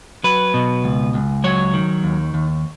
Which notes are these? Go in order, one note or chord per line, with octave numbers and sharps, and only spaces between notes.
F#3 B4
B2
C#2
C#2
F#3 C#5
D#3
D#2
D#2